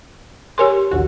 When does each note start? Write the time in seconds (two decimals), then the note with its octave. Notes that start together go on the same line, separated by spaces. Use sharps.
0.58 G4 G#4 A#4 C#5 G#5 C6
0.91 A#1 D#2 F#4